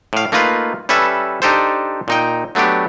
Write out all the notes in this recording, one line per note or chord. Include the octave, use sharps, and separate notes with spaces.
A2 F5
A3 A#3 D#4 F4 B4
G3 C#4 A4 B4 E5
D4 D#4 G4 A4 C5
A#2 D#4 G5
F#3 A3 B3 D4 G4